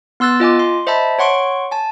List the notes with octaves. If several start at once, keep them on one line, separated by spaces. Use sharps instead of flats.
B3 C6 E6 F#6 A6
F4 D#5 G#5 D6
C6
C5 D#5 E5 A5 B5
C#5 F#5 C6 C#6 D7
G#5 A5